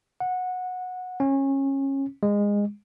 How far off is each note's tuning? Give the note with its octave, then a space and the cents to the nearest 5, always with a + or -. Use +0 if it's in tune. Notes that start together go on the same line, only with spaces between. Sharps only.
F#5 -15
C#4 -25
G#3 -20